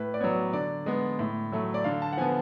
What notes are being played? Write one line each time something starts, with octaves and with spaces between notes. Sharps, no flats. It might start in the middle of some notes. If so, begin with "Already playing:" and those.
Already playing: A2 B4
D5
F#3 B3 C#5
D3 D5
G#3 B3
A2
F#3 A3
D5
D3 F5
A5
F#5
F3 B3 G#5